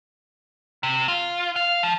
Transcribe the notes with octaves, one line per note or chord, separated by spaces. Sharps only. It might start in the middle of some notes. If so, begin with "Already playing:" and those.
C3
F4
F5
F3